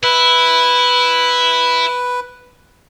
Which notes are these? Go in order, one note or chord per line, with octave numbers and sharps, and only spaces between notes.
E4 B4